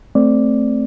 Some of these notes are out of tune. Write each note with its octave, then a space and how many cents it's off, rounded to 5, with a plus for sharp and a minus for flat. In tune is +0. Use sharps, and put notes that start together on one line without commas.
A3 +0 C4 +0 D5 +0